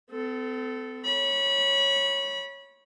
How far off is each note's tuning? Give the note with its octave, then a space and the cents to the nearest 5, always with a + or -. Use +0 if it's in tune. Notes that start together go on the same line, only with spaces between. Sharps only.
C4 -45 A4 +0
C#5 -10 B5 -30